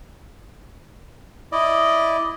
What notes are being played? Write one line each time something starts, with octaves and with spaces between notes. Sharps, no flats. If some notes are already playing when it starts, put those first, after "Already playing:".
E4 D5 D#5